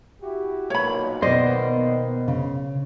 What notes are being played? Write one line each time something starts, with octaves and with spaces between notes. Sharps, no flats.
E4 F#4 G4
B1 A#2 C#5 B5
B2 D#3 A#3 B3 C5 D5 D#5
C#3